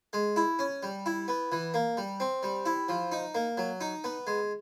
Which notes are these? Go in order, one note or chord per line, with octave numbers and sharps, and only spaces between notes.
G#3
E4
C#4
G3
E4
B3
E3
A#3
G3
C4
G3
E4
F3
D#4
A#3
F#3
D#4
B3
G#3